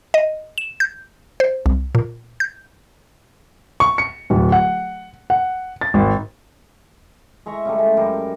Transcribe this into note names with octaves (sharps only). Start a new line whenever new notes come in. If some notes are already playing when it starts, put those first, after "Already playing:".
D#5
E7
G6
C5
C2
A#2
G6
C#6
C#7
D1
F#5
F#5
A6
G#1
G#3 E5 A#5 C#6
C#3 G3 A3
G#3
F#2 G3 A#4